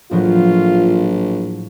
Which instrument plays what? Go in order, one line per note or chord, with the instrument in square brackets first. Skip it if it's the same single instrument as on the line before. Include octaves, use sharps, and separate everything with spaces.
[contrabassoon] A#1 [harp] A2 F3 F#3 [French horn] F4